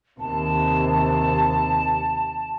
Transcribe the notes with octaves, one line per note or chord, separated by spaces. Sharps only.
D#2 C3 A5